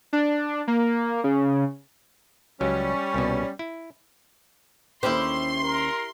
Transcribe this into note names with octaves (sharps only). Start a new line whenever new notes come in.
D4
A#3
C#3
C#2 F#3 G3 C#4
C2 B2
E4
D#2 C#4 E4 G4 C5 C6
A#4